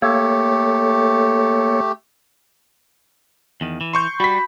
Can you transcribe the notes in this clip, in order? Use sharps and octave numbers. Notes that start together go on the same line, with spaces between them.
A3 A#3 G4 A4 C#5
E2 D#3
E3
C6 C#6 G6
G3 F#4 B5 B6